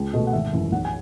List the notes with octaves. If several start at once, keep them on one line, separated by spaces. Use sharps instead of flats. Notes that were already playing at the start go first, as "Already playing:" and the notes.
Already playing: C#2
B2 A3 D#5
F#5
G#1 E5
F#2 E3
B1 F#5
G#5